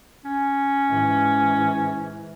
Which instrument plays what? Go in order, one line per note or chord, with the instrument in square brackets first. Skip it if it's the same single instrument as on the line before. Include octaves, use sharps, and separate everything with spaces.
[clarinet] C#4
[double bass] G#2 E3